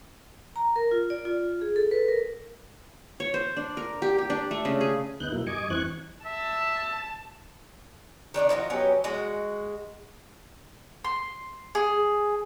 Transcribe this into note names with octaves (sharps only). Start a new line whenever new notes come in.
A#5
A#4
F4
D5
F4
G#4
A4
B4
A#4
C#5
C5
D4
A#4
G4
G4
D4
A3
C#3
G#4
D2 B3 D#4 F#6 G6
B2 F#3 A#3 E4
G2 D#5 G#5 C#6 D6
E2 E3 C4 C#6 F#6 G#6
E5 A5
D#3 D4 C#5 D5
F3 D#4 F4 F#4
F#3 B3 C#4 G4
G#3 F#4
C6
G#4